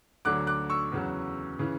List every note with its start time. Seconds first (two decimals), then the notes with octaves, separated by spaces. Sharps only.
0.25 D2 D3 F#3 D6 F#6
0.47 D6 F#6
0.70 C#6 E6
0.92 E2 C#3 F#3
1.59 C#3 E3